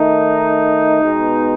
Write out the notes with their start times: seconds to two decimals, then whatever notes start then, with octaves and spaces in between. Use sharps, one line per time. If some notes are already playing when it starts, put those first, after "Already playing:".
Already playing: D#3 A3 D#4
1.01 B2 G#3 B3